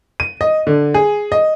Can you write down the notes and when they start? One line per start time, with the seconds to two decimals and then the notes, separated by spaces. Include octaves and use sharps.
0.20 D#7
0.41 D#5
0.67 D3
0.94 G#4
1.32 D#5